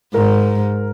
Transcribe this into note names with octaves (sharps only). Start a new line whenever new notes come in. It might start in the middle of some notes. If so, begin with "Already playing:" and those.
G#2 A#4